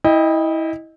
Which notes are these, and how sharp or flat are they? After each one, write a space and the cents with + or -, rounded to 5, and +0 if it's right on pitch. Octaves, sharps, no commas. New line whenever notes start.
E4 -20 D#5 +0 G5 +25